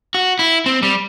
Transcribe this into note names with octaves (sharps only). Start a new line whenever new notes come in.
F#4
E4
C4
G3